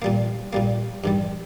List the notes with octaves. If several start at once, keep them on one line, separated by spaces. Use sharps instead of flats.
A#2 G3 A#3
A#2 G3 A#3
G2 D#3 G3